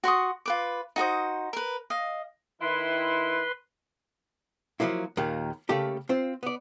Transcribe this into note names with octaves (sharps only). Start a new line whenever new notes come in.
F#4 C6 C#6 D#6
F4 B4 D6
D#4 F#4 C5 D#6
A#4 B4
D#5 F5
D#3 E4 B4 C6
F3 F#3 A#3 E4
D#2 A#2 D#3 A#3
C#3 A3 A#3 G4 A4
C4 F4 C5
B3 D5